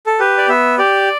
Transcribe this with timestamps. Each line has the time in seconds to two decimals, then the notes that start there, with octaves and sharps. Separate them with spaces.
0.06 A4
0.20 G4 B4
0.38 D5
0.48 B3 E5
0.78 G4 D5